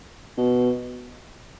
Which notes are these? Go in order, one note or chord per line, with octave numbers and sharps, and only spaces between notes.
B2